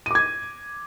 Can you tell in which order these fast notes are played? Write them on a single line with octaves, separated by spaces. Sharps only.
D#7 D6 G#6